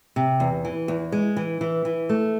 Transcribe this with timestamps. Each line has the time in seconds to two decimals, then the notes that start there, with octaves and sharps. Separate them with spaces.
0.16 C3
0.40 E2
0.65 E3
0.88 E2
1.12 G#3
1.36 E3
1.61 E3
1.85 E3
2.09 A3